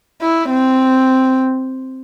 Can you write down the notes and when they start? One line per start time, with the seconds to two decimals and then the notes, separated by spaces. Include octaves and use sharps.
0.22 E4
0.50 C4